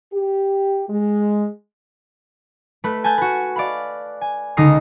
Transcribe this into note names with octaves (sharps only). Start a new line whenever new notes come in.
G4
G#3
A3 B4
G#5 A5 G6
F#4 B4
D5 F5 B5
G#5
C#2 D3 D#4 D#6 F6 C7